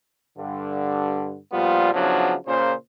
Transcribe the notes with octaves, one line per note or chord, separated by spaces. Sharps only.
G2 D3
A#2 F3 G3 B3 F4
C#3 F3 F#3 B3 D4 E4
A#2 C#3 C5